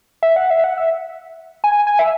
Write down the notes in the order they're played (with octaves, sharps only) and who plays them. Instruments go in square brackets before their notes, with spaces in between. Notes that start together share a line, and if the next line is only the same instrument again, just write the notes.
[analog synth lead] E5
F#5
E5
F#5
E5
G#5
G#5
E5